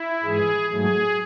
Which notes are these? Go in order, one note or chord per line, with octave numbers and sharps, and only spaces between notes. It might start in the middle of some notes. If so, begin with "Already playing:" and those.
Already playing: E4
G#2 E3 G#3 G#4
G#2 F#3 A3 G#4